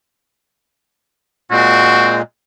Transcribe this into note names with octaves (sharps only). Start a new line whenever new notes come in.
A#2 G#3 C4 F#4